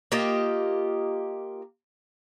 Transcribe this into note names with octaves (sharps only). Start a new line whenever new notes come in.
A#3 F4 G4 D#5